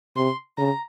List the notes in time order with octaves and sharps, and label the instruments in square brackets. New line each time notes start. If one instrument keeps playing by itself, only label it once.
[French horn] C3 [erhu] C6
[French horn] C#3 [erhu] A#5